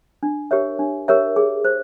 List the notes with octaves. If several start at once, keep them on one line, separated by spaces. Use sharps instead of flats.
D4
G4 A#4 C#5 E5
D4
G4 A#4 C#5 E5
G#4
C5